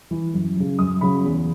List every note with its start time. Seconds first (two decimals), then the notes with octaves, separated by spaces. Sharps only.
0.11 E3
0.34 F#2
0.56 C#3 F#3
0.79 F#2 D#6
1.01 C#3 F#3 B5
1.24 E2